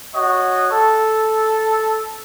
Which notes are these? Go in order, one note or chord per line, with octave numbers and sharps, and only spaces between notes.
F#4 C#5 D#5
A4